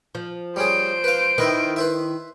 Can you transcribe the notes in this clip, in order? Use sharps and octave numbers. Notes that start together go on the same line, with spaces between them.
F3
G3 C#4 G#4 C5 D7
B4 F5
D#3 E4 B4 D#5 E5
B4 C5 E5